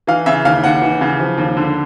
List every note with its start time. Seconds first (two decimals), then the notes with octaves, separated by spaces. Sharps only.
0.07 E3 F5
0.26 C#3 E5
0.45 D#2 F5
0.64 D#2 F#5
0.82 E3
1.01 C#3
1.20 F3
1.38 D#2
1.57 D3